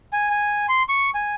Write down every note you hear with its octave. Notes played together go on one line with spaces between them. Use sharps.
G#5
G#5
C6
C#6
G#5